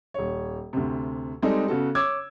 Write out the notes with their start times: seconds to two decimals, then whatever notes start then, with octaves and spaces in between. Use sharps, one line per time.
0.14 D#1 C#5
0.73 D2 C3
1.42 G3 G#3 C4 D#4 G#4 A4
1.68 C#3 B3 F#4 A4
1.95 C#5 D6 E6 G#6